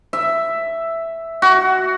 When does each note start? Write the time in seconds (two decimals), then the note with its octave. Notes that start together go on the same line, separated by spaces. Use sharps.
0.13 E5
1.42 F#4